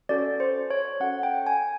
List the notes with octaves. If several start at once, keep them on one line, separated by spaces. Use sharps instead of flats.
C#4 F#4 A4 D5
C5
C#5
C#4 F#4 A4 F#5
G5
G#5